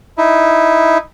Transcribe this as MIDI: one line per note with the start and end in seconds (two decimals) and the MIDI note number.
0.18 0.98 63
0.18 0.98 64